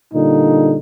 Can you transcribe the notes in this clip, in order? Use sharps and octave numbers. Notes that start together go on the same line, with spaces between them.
A#2 D3 G3 D#4